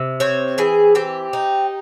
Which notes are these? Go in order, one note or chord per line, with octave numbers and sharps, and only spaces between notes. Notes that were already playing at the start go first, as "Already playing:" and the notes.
Already playing: C3
C4 C#5
E3 G#4
C4 G4
D#4